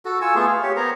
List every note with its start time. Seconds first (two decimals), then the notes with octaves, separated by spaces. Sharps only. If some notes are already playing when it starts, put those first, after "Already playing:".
0.05 F#4 A4
0.21 F4 G#5 C#6 E6
0.35 A3 B3 F4 G#4
0.47 F5
0.63 G4 C#5
0.76 B3 A#4 C5 A#5